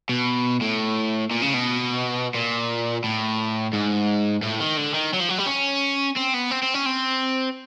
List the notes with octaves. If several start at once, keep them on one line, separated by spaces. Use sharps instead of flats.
B2
A2
A#2
C#3
B2
A#2
A2
G#2
A2
D#3
D3
D#3
F#3
F3
F#3
G3
C#4
C4
B3
C4
C4
C#4
C4